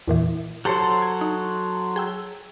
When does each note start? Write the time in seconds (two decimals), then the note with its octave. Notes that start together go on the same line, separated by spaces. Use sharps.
0.08 E2 A#2 E3
0.65 F#3 G4 A4 C5 C#5
1.02 G#6
1.21 D#4
1.96 G#4 G5 E6